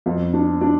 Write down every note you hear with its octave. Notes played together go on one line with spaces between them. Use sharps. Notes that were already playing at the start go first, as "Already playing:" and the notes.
F2
D4
D4